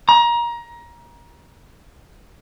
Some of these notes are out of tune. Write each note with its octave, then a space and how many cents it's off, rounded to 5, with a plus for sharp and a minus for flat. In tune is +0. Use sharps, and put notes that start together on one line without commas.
A#5 +25